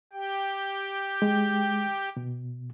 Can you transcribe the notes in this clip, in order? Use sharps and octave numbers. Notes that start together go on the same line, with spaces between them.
G4 G5
G#3
B2